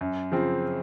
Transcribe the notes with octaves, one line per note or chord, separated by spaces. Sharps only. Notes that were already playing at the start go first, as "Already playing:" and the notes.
F#2
C#3 F3 C4